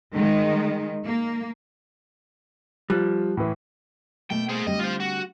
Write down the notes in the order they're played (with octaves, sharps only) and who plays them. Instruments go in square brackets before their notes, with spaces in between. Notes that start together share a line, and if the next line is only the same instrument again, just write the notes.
[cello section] D#3 G#3
A#3
[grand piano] F3 F#6 [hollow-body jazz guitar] G3
[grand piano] A2 E3
[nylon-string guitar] B2 A3 A#3 [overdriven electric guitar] G5
[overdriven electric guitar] G#4 C5
[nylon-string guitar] D3 G3 C4 [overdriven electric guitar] D#5
[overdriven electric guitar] F4 C5
F#4